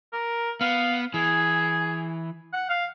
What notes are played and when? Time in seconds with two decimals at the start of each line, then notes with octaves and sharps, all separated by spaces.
0.13 A#4
0.61 B3 F5
1.14 E3 G#4
2.53 F#5
2.69 F5